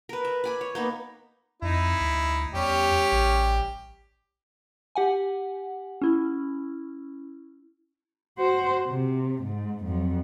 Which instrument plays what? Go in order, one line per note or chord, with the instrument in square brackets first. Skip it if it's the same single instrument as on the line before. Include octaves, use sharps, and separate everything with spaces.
[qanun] A#4 B4
E5
D5 G#5 B5
C#5
A#3 B3 D#4
[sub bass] F2 [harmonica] D#4 E4
[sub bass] D2
[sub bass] E2 [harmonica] G3 C#4 G4
[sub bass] A1
[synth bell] G4 F#5 G#5
C#4 E4
[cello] F#4 C5
C3
G#2
F2 F#3